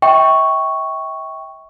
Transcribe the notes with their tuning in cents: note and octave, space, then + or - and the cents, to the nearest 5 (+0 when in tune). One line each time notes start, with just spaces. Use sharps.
E5 -40 G5 +0 C#6 +0